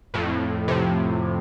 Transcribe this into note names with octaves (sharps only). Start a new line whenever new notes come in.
F2 A2
A2 C3